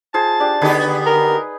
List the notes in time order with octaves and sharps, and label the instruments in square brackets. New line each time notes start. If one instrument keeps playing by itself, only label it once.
[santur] F3 G#4 C5 [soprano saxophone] A5
[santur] D4 G4
[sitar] D3 B3 G4 [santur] D#4 G#4 B4
[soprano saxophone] A#4